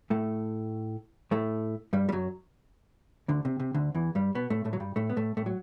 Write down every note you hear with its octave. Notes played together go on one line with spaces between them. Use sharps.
A2 A3
A2 A3
G2 G3
G3
F#2 F#3
D2 D3
C3
C3
D2 D3
E2 E3
G2 G3
B2 B3
A2 A3
A2 A3
F#3
G2 G3
A2 A3
B3
A2 A3
A2 A3
F#3